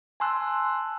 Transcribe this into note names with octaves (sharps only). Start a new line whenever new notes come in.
G#5 A5 C6 E6 F#6